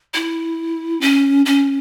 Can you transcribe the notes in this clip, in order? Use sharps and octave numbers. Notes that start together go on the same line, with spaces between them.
E4
C#4
C#4